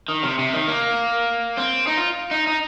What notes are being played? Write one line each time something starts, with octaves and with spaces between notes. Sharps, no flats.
D#3
C3
C3
D#3
A#3
C4
D#4
F4
D#4
D#4